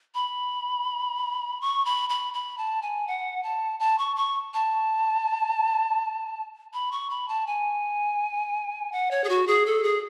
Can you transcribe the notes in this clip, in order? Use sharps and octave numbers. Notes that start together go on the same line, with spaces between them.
B5
C#6
B5
B5
B5
A5
G#5
F#5
A5
A5
C#6
C#6
A5
B5
C#6
B5
A5
G#5
F#5
C#5
G#4
F#4
G#4
A4
G#4